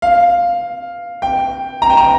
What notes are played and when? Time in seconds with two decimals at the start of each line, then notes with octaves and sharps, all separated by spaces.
0.02 F5
1.22 G5
1.82 A#5
1.90 G5
1.97 A#5